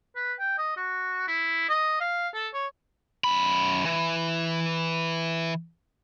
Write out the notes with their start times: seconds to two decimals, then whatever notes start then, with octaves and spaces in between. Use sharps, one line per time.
0.16 B4
0.39 G5
0.58 D#5
0.77 F#4
1.28 E4
1.69 D#5
2.01 F5
2.34 A4
2.53 C#5
3.24 F#2 B5
3.85 E3